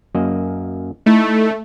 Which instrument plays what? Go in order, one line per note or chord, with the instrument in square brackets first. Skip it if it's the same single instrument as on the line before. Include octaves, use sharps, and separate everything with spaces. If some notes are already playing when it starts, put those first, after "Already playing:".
[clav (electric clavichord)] F#2 A#3 D#5
[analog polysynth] A3 [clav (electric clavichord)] D#4 E4